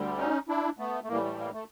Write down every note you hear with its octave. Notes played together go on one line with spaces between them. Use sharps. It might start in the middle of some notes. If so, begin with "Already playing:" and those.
Already playing: D2 D3 G3
C#4 D#4
D4 E4
A3 B3
A3
A2 E3 G3 A#3
A3
A#3
A3